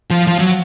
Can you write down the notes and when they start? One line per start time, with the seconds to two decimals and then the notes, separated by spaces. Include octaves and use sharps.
0.11 F3
0.27 F3
0.39 F#3